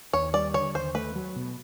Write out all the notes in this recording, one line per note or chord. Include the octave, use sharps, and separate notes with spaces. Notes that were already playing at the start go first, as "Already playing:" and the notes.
D#2 C#5
G3 D5
D3 C#5
D#2 C5
A3 B4
F#3
B2